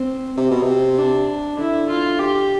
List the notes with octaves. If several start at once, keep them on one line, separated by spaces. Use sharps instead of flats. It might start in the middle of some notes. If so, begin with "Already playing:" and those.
Already playing: C4
C3 C4
B2
C3
C4
D4
D3 E4
F4
G4